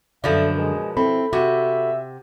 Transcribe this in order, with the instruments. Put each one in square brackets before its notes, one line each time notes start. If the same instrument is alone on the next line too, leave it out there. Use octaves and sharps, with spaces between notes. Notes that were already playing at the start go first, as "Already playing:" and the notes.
[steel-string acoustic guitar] F#2 D3 [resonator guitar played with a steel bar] B2 F3 D4 [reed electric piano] A4 D5 [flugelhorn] E5
[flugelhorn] G#3 [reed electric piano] A#4
[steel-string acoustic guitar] C4 [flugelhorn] E4 [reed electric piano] A4 B5
[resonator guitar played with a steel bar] C3 [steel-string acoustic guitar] F#4 [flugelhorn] E5